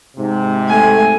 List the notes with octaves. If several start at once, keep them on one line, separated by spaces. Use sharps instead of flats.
G#2 C3
A3 G#5